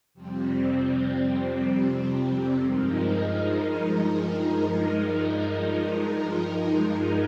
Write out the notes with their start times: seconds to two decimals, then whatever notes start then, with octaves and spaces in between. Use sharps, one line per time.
0.14 F2 C3 G3 C4
2.63 G2 F3 G#3 D#4 A#4